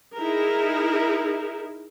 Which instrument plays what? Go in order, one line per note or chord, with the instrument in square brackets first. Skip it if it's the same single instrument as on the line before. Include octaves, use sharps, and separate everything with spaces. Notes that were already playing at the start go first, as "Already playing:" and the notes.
[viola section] D#4 E4 G#4 A#4